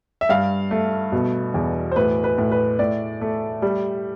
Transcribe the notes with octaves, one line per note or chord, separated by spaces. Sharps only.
E5
G2 F5
A3
B2
E2
C5
A2 B4
B4
A2
B4
A2 D5
A3
G3